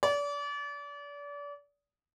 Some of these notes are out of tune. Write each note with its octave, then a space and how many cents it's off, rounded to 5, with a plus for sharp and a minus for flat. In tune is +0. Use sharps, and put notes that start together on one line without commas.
D5 -35